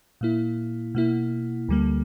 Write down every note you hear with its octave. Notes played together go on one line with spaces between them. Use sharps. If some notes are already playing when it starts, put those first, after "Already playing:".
A#2 A#3 E4
B2 A#3 E4
D2 D3 G3 A#3